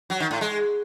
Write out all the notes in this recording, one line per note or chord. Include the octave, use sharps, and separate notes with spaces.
F#3
D#3
A2
G#3